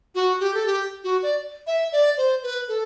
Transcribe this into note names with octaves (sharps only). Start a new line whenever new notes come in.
F#4
G4
A4
G4
F#4
D5
E5
D5
C5
B4
A4